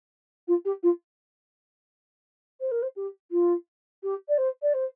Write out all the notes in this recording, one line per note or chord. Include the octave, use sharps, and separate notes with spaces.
F4
G4
F4
C5
A#4
C5
G4
F4
G4
D5
C5
D5
C5